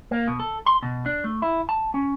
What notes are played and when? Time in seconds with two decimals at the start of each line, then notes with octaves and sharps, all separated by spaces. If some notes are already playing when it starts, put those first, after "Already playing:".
0.11 A#3
0.28 B2
0.40 A4
0.66 C6
0.83 B2
1.06 D4
1.24 A3
1.42 E4
1.69 A5
1.94 C#4